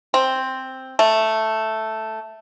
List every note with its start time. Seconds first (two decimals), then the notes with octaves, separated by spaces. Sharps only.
0.14 C4
0.99 A3